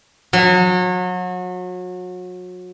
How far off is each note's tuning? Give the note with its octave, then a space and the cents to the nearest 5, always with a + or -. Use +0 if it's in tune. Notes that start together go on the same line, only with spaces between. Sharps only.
F#3 -30